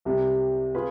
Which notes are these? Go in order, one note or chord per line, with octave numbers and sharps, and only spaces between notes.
C2 C3 G3
F4 G#4 B4